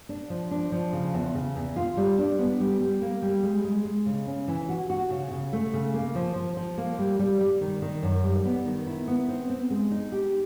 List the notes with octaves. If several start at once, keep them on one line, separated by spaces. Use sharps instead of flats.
D4
F3
D4
F3
C#3
E2
C#3
E2
F4
G3
D4
B3
G3
G3
A#3
G3
G#3
G#3
G#3
C#3
C#4
E3
F#4
F#4
C#3
C#3
A3
C#3
A#3
F3
F3
F3
A#3
G3
G3
G3
D#3
D#3
F#2
G3
B3
D#3
E4
B3
C4
C4
G#3
D#4
G4